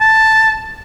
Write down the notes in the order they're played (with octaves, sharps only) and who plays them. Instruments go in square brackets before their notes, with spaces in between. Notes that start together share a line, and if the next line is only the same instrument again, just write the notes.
[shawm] A5